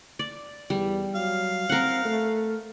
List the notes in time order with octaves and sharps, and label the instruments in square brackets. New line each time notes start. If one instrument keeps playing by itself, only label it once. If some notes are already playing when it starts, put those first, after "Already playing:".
[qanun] D5
[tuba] E2 [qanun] G3
[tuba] F#3 [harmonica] F5
[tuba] C4 [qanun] A#4 F#5
[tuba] A3